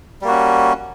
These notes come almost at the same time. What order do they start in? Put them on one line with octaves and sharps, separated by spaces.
G3 A#3 F#4 C#4